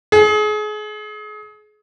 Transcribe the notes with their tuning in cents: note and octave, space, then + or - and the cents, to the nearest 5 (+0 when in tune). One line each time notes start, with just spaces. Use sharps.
G#4 +30